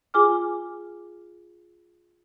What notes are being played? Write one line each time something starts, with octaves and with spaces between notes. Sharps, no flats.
F4 G#4 G#5 D6 F6